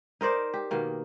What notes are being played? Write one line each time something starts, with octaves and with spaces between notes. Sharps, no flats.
D#4 A#4 C5 D5
G4
B2 D#3 A#3